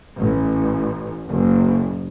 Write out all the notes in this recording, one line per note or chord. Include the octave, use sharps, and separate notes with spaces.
A1
F#1